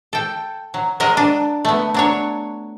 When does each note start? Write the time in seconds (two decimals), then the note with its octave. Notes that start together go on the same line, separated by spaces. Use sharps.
0.13 A4 G5
0.74 F#3
1.00 F#3 G#3 A#4 D#5
1.17 D4
1.65 A3 B3
1.94 F#3 D4 C#5